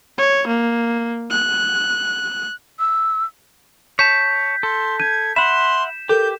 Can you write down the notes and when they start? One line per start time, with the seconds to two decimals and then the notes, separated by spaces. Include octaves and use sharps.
0.19 C#5
0.48 A#3
1.31 F#6
2.79 E6
3.99 C#5 A5 G6 B6
4.63 A4 C6
5.00 G6 G#6 D#7
5.36 E5 F#5 B5 C6 E7
6.09 G4 A4 A#4 G6